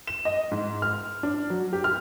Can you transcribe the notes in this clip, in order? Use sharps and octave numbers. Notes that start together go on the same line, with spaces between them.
E7
D#5
G#2
F6
D4
F#3
G4
F6